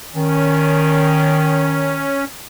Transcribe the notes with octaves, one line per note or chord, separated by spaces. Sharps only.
D#3 C#4